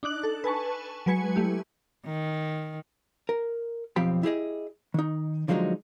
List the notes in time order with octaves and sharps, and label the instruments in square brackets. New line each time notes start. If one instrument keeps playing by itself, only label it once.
[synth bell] D4 D#4 D6 F#6 F#7
A4
B4 G#5 A5 C#6
F#3 G#3 B4 G#5 C#7
A3 E4 G4
[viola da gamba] D#3
[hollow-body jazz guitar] A#4
B1 F2 F3 C4 G4 B5
E4 G4 G#4 D#5
D#3 D#4
D3 F3 F#3 G#3 C#4 D#4